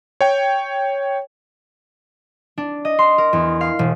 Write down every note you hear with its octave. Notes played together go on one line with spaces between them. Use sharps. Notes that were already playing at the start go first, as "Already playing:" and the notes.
C#5 G5
D4
D#5
C6
A#4
E2
F5
E1